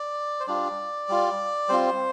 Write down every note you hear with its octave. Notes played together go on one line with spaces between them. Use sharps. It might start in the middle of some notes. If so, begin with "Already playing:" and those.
Already playing: D5
C5
G3 D4 F4 D5
G3 F4
G3 C4 F4 C5